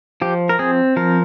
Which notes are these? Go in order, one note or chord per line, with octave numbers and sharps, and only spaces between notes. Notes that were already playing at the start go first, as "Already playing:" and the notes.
F3 G4
A#4
C4 G#4
F3 A#4